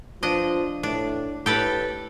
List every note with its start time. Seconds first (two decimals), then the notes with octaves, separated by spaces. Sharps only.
0.23 F3 D4 D#5
0.83 A2 D4
1.46 A2 G4 A4 B4